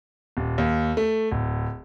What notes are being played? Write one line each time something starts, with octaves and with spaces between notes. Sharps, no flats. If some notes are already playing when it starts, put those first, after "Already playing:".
D#1
D#2
A3
D1